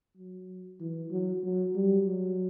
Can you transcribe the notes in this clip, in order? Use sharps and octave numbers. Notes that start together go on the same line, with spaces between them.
F#3
E3
F#3
F#3
G3
F#3